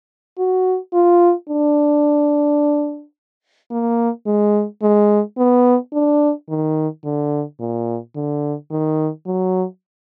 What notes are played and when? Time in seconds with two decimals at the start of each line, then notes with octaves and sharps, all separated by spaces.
0.38 F#4
0.94 F4
1.49 D4
3.71 A#3
4.26 G#3
4.82 G#3
5.38 B3
5.93 D4
6.49 D#3
7.04 D3
7.60 A#2
8.16 D3
8.71 D#3
9.26 F#3